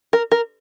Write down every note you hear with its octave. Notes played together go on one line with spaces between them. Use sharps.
A#4
A#4